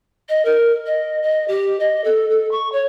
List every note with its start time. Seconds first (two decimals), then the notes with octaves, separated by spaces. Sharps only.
0.29 D#5
0.45 A#4
0.86 D#5
1.23 D#5
1.48 G4
1.80 D#5
2.04 A4
2.30 A4
2.51 C#6
2.72 C#5